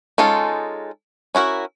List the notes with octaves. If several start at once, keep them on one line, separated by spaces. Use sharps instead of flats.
G#3 C#4 D#4 F4 A4
C#4 E4 F#4 A#4